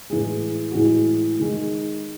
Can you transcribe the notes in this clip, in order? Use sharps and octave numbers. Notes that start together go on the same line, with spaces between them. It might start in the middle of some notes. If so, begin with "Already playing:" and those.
A2 E3 G#3 G#4
F#4
A2 E3 G#3 G#4
D#3 G#3